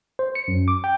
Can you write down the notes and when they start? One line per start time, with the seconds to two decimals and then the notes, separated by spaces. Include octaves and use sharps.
0.19 C5
0.35 C#7
0.48 F#2
0.68 D6
0.84 G5